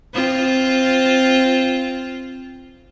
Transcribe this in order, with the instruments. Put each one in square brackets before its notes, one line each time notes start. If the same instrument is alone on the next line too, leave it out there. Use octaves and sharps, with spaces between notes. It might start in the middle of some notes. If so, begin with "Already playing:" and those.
[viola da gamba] C4 F4